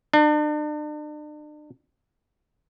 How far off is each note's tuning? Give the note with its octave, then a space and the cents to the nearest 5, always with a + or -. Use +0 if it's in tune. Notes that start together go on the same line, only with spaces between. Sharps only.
D4 +40